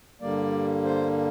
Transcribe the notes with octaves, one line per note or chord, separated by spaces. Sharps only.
G2 D3 G3 A#3 D5
C5